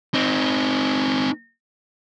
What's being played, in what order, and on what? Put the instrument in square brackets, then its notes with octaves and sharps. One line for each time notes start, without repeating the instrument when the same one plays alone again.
[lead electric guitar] C4 D#4